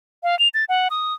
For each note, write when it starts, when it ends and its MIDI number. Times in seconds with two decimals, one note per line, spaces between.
0.23 0.38 77
0.39 0.48 101
0.54 0.65 93
0.69 0.88 78
0.90 1.14 87